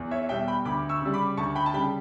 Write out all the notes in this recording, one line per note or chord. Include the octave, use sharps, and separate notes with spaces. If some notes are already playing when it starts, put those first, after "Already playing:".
Already playing: E2
C#5 E5
B2 G3 E5 G5
G5 B5
D2 B5 D6
C#6 E6
C#3 G3
B5 D6
D2 A5 C#6
G5 B5
A5
C#3 G3 G5 B5